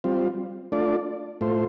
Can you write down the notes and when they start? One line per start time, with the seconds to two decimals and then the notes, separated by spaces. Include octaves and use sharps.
0.04 G3 C4 F4
0.72 A3 D4 F4 D5
1.41 A2 A3 F4 C5